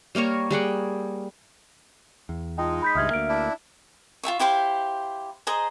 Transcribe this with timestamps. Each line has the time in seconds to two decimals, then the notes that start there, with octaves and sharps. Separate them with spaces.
0.15 G3 A#3 A#4 C#5
0.51 G3 G#4 F#5 G5
2.29 E2
2.58 G#3 D#4 F4 G5 A5
2.82 B5 G6 B6
2.95 C#2 G2 E5 D#6 F6 G#6
3.11 D2 A#3 F6 D7
3.29 D4 E4
4.23 F4 G#4 E5 C#6
4.39 E4 G4 C5 F5
5.47 G#4 C5 D#5 A#5